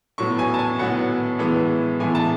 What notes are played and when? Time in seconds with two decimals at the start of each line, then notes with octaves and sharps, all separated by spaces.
0.18 A2 F#3 B3 C#6
0.39 G#5
0.54 A5
0.59 G#5
0.78 A2 F#3 B3 F#5
1.39 A2 E3 G#3 B3
1.99 A2 E3 G#3 B3 G#5
2.15 A5